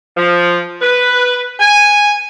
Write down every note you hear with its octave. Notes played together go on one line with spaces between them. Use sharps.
F3
B4
G#5